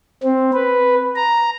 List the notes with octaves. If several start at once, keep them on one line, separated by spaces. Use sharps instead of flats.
C4
B4
A#5